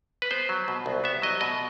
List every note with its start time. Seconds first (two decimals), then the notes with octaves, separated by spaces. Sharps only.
0.22 B4
0.31 B3 C5
0.49 F#3
0.68 B2
0.86 C2
1.04 B3 E5
1.22 F#3 D#5
1.41 B2 D#5